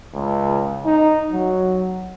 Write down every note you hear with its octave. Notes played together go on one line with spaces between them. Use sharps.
C#2
D#4
F#3